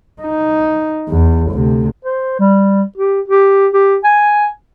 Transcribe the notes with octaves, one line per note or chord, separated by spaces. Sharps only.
D#4
E2
D2 C3
C5
G3
G4
G4
G4
G#5